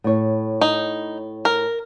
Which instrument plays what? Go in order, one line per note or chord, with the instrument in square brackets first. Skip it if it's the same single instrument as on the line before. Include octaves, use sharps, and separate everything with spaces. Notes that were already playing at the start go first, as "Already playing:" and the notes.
[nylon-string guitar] A2 C#5
[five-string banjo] D#4
A#4